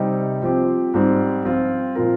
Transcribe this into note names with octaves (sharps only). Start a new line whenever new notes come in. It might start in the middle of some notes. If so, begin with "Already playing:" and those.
Already playing: C3 G3 C4 D#4 G4
F3 C4 G4
G#2 G3 C4
F3 C4 F4
A#2 F3 C4 F4 A#4